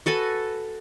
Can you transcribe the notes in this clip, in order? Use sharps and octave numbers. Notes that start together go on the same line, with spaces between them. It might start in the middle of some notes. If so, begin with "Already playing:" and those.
F#4 A4 B4 G#5